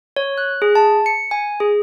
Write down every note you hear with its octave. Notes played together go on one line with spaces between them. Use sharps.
C#5
F#6
G#4
A5
C#7
G#5
G#4